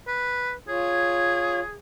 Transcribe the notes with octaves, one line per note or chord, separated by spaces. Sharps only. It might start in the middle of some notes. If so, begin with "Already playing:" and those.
B4
F4 G#4 C#5